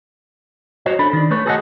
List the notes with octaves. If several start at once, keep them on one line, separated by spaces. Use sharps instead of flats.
F#4 C5 C#5 D#5
D4 A4 B5
D#3 D4
A3 B4 C#5
F#4 G#4 A4 C5 D#5 F#5